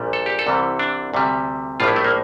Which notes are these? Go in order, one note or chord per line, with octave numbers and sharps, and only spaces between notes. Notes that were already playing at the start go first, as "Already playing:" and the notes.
Already playing: A#1 A#2 G3
A4
G4
A4
C2 C3 E3 G3
D4
D2 C3 G3
A#1 A2 G3 F4
E4
A3
A#3